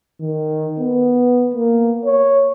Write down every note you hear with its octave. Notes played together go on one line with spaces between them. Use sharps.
D#3
B3
A#3
C#5